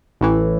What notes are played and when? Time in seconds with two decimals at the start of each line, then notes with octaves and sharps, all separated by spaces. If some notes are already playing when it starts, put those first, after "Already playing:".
0.21 A1 A2 E3